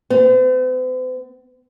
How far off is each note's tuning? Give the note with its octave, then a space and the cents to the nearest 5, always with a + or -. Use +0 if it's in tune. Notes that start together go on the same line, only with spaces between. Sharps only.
C4 -45